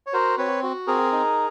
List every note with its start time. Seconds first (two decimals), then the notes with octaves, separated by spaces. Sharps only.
0.07 C#5
0.13 F#4 A#4 C5
0.38 C4 B4 C#5
0.63 F#4
0.87 C4 G#4 A#4
1.12 D#4